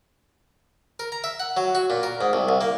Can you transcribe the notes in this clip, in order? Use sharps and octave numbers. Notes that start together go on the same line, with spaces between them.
A#4
A#5
E5
F#5
F#3
F#4
A#2
A#4
G#2
C2
C2
A#3